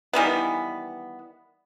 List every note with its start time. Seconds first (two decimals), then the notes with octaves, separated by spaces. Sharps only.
0.13 D#3 E3 G3 B3